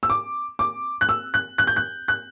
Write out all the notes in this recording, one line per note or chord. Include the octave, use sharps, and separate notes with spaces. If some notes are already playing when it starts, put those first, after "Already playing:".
E6
D6
D6
F#6
E6
F#6
F#6
G6
F#6
F#6